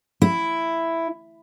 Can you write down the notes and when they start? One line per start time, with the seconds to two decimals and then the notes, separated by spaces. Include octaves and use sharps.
0.22 E4